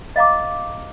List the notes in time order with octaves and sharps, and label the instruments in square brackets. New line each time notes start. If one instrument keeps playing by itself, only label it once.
[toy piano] D#5 F5 A#5 D6